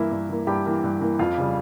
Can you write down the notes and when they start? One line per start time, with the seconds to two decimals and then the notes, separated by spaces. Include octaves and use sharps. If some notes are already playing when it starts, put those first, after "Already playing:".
Already playing: G2 E3 A#3 E4 E5
0.11 G2
0.30 E3 A#3
0.47 G2 G4 G5
0.66 E3 A#3
0.84 G2
1.01 E3 A#3
1.19 F2 F4 F5
1.38 C#3 G3